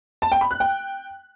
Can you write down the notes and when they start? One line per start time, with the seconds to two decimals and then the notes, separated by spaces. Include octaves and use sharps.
0.22 A5
0.32 G5
0.41 B5
0.51 F#6
0.60 G5